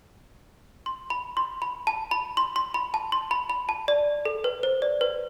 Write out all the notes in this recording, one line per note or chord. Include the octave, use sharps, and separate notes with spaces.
C6
B5
C6
B5
A5
B5
C6
C6
B5
A5
C6
B5
B5
A5
D5
A4
B4
C5
D5
B4